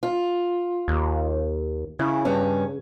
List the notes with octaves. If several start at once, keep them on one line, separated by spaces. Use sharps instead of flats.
F4
D#2
C#3 E4
G2 C#4